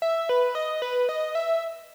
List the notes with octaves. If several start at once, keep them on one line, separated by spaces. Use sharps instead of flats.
E5
B4
D#5
B4
D#5
E5